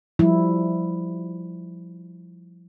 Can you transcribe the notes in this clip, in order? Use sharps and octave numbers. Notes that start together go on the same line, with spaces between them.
F3 G3 E4